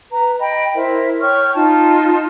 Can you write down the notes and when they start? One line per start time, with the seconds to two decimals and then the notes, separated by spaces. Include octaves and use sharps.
0.11 B4 A#5
0.39 D#5 G5 B5
0.75 E4 A#4 C5 E5
1.21 C#5 G5 C#6 F6
1.55 D#4 F4 A5